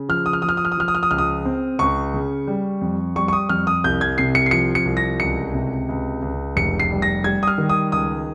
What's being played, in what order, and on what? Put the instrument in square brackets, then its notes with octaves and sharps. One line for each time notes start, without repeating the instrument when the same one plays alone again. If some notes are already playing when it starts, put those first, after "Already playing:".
Already playing: [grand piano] C#3
F3 F6
D#6
F6
F3 D#6
F6
D#6
F6
D#6
F3 F6
D#6
F6
D#6
C#2 F6
D#6
C4
C#2 C#6
C#3
G3
F2
G3 C#6
C#6
D#6
F2 F6
D#6
C2 G6
G#6
C3 C7
C#7
C7
F3 C#7
C#7
C2
A#6
C#2 C#7
C3
C#2
C#2
F1 C#7
C7
G3
A#6
G3 G#6
D#6
F6
D#3
D#6
C#2 D#6